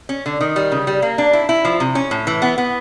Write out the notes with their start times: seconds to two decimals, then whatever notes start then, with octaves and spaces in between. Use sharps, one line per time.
0.09 C#4
0.26 D3
0.41 D#3
0.56 G3
0.72 C#3
0.87 G3
1.02 A#3
1.18 D4
1.33 E4
1.49 E4
1.65 F3
1.80 C3
1.95 C#4
2.11 A2
2.27 E3
2.42 B3
2.58 B3